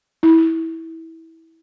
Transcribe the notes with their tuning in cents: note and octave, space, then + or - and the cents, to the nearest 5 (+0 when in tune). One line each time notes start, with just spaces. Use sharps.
E4 -20